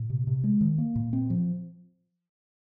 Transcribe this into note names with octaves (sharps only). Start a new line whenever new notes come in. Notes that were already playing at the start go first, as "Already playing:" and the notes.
Already playing: A#2
C3
C3
G#3
D#3
A#3
A#2
C4
F3